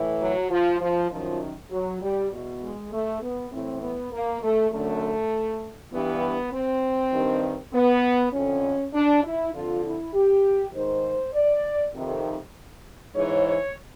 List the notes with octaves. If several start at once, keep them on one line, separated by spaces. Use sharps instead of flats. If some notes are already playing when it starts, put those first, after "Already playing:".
Already playing: A2 E3
F#3
F3
F3
F#2 D#3 F3
F#3
G3
E2 B2
G#3
A3
B3
A2 E3 C4
B3
A#3
A3
F#2 D3 A3
G2 E3 B3
C4
G2 D#3
B3
F2 D3 C#4
D4
E4
F2 D3 F4
E4
G4
G#2 D#3 C5
D5
F2 C3 D#3
G#2 E3 C#5
C#5